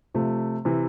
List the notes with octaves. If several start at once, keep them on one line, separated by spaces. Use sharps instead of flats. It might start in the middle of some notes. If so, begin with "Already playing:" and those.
C3 F3 A3
C3 E3